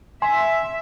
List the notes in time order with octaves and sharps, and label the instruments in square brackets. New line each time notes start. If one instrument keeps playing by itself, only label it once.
[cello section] E5 [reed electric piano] G#5 C6